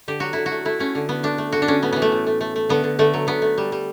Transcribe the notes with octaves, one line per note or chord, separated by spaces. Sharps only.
D3 G4
F#3 F#4
D3 E4
F#4
A3
A3 E4
A3 C#4
D3
D3 B3
A3 D4
A3
D3 F#4
D4
D3 C#4
A2 B3
E3 B3
A3
A2
A3
A3
A3
D3 B3
D3
D3 A3
F#3
D3 B3
A3
G3
G3